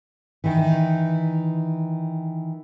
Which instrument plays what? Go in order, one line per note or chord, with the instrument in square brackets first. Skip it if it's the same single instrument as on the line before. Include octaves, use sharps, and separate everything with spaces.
[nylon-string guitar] D#3 E3